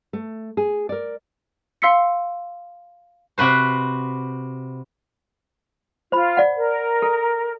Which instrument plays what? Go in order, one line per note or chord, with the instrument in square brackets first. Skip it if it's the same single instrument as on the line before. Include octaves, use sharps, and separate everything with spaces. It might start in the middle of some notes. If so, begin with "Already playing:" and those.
[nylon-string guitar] A3
G#4
A#4 D5
[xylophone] F5 C6 E6 B6 C#7
[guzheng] C3 F#4 B4 C5
[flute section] F4 [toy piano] C5 B5
[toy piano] D5 F#5
[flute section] A#4
[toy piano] A4